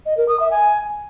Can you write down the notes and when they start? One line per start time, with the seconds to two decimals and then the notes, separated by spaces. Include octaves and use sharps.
0.06 D#5
0.17 A#4
0.28 D#6
0.40 E5
0.51 G#5